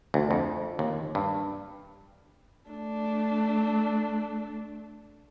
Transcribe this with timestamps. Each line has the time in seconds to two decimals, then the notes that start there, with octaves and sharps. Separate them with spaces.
0.14 D2
0.31 F2
0.79 D#2
1.15 G2
2.70 A3 D4